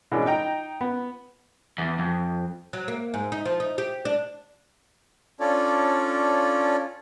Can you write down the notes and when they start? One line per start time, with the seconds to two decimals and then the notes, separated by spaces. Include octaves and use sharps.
0.12 B2 E3 G#3 C#4 D4
0.26 D#4 G5 A#5
0.81 B3
1.78 E2
1.99 F2
2.73 F#3
2.88 A#3
3.14 G#2
3.32 D#4
3.46 F3
3.60 D#4
3.78 G4
4.05 D4
5.40 C#4 D4 F4 A4 C#5 D5